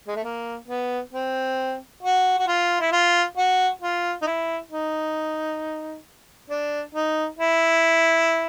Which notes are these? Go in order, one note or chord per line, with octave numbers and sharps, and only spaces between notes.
G#3
A3
A#3
B3
C4
F#4
F#4
F4
E4
F4
F#4
F4
D#4
E4
D#4
D4
D#4
E4